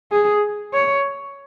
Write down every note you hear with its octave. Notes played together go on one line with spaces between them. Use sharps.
G#4
C#5